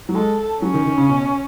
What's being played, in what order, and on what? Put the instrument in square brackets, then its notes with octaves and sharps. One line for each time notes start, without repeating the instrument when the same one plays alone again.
[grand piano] F#3
[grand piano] G#3 [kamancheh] A4
[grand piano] F#3 [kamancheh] C#4
[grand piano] D#3
D#3
C#3
B2